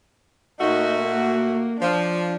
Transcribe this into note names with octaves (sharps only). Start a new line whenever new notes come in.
A#2 A3 D#4 F#4
A#3
F3 D4